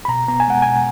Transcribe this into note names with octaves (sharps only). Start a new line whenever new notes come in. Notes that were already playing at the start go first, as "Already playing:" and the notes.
B5
B2 A#5
B3 A#5
G#5
G#3 F#5
B2 G#5